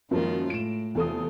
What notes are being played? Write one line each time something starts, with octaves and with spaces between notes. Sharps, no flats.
F#2 D#3 F3 G#3 A#3 F4
A2 D7 E7
E2 C3 F4 A4 D#6